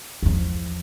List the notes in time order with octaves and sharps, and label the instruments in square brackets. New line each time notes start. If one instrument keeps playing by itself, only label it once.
[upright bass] E2 F3